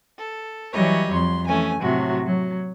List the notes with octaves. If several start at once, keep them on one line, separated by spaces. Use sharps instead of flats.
A4
E3 F#3 G3 C#5 D#5
F2 C6
E3 A3 C#4 G#5
A2 C3 F#3 F#4
F#3